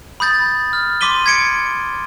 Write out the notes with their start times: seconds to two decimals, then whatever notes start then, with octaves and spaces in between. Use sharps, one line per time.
0.20 B5 D#6 G6 A6
0.73 F6
1.01 C6 D6 B6 D#7 G7
1.26 G#6 B6 C#7 D7